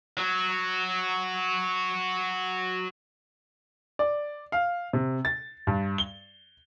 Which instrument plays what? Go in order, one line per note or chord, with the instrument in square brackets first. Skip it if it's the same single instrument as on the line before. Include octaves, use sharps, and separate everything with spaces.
[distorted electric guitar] F#3 F#4
[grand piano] D5
F5
C3
A6
G2
G7